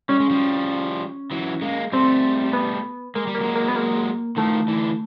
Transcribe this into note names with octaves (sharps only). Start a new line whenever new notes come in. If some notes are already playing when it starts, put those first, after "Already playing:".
G3 C#4
G#3
F3 G3
E3 F#3
G#3 A#3
G3 A3 C4
B3
G#3 A#3
G3
A#3
F#3 G#3
A#3
B3
A#3
D#3 F3 A3
D3 E3